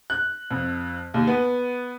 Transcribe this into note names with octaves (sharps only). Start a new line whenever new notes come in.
F#6
F2
D#2
B3